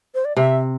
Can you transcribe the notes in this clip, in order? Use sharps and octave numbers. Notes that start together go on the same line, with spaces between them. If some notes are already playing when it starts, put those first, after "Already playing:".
C5
D5
C3 E5